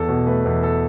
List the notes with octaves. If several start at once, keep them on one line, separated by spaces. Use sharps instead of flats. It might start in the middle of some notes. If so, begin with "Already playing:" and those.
Already playing: E2 A4
B2
A3 B4
E2
A4